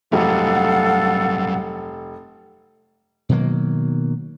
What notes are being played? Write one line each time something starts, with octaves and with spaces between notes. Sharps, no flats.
F1 G2 F#3 A4 F5 F#5
B2 D#3 F#3 A#3